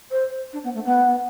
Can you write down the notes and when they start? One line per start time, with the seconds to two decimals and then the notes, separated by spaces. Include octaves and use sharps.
0.11 C5
0.53 D4
0.64 B3
0.74 A3
0.85 B3